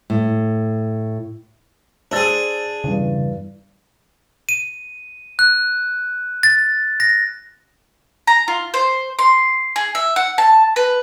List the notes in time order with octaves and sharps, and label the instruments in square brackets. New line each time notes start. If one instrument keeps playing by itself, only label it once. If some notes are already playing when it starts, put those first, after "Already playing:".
[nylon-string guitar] A2
[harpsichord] D4 G#4 [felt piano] C5 E6 A6
[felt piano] E2 G2 [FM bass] C#3
[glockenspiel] D#7
F#6
A6
A#6
[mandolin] A#5
F4
C5
C6
G#4
E5
F#5
A5
B4